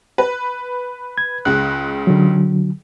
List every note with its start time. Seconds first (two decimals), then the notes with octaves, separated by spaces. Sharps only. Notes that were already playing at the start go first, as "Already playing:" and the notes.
0.18 B4
1.18 G#6
1.45 C#2 C#3 F#6
2.07 D3 F#3